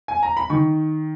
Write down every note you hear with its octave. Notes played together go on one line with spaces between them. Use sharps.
G#5
A#5
B5
D#3 C#6